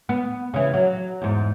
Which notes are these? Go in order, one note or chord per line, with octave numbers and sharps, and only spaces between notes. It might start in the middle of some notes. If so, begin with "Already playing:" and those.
B3
C#3 E3
F#3
E2 G#2